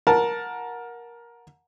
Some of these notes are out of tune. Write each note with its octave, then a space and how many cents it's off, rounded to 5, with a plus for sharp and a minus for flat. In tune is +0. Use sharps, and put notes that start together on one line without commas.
A#4 +15 F#5 -20 A5 +0